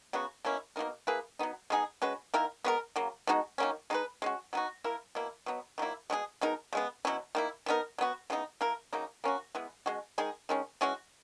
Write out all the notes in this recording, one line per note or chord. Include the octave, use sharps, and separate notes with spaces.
C#3 F#3 B3 F#4
B2 A#3 C#4 E4
B2 A#3 D#4 A#4
A#3 E4 G#4 B4
F#3 B3 D#4
G#3 B3 D#4 G#4
G#3 C#4 F#4 B4
D#3 A#3 E4 A#4
G#3 B3 F#4 A#4
C#3 F#3 A#3
B2 G#3 D#4 F#4
D#3 F#3 A#3 C#4
G#3 D#4 F#4 B4
G#3 C#4 F#4
F#3 B3 D#4 F#4
A#3 E4 A#4
B2 A#3 E4
B2 F#3 B3
D#3 F#3 A#3 E4
B2 G#3 D#4 G#4
B2 G#3 D#4 A#4
C#3 G#3 B3
B2 F#3 C#4 E4
D#3 A#3 E4
E3 B3 D#4 A#4
F#3 B3 F#4
C#3 E3 B3 D#4
A#3 E4 A#4
C#3 F#3 A#3 D#4
A#3 C#4 F#4
E3 G#3 B3
B2 G#3 C#4 F#4
D#3 G#3 D#4 G#4
D#3 G#3 C#4
E3 G#3 C#4 F#4